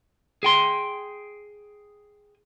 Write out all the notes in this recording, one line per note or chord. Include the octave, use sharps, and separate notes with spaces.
G#4 G5 C6